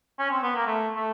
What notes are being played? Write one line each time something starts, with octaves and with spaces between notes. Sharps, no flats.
C#4
C4
B3
A#3
A3
A3